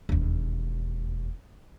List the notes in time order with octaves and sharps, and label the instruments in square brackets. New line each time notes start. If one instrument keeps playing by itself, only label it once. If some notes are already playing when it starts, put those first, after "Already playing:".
[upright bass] E1 D#2